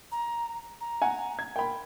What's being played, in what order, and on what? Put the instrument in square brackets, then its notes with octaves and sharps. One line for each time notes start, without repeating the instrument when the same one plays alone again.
[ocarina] A#5
A#5
[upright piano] F#5 G#5
G#6
[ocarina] A#4 [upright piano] G5 B5